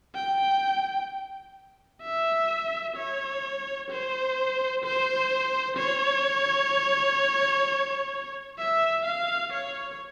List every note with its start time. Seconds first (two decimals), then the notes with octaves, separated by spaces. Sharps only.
0.15 G5
2.02 E5
2.96 C#5
3.90 C5
4.84 C5
5.77 C#5
8.58 E5
9.05 F5
9.52 C#5